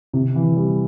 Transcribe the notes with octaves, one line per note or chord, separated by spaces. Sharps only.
C3
E3
G3